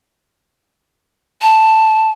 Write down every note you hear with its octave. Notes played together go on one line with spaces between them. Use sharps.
A5